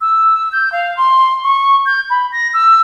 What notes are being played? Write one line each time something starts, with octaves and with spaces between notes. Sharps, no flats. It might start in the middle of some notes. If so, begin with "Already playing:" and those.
E6
G6
F5
C6
C#6
G6
B5
A#6
E6